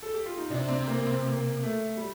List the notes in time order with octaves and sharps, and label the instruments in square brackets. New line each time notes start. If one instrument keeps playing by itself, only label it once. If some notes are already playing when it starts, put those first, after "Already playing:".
[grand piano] A4
G4
F4
D#4
[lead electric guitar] C3 [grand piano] D4
[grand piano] C4
A#3
C4
A#3
A3
G3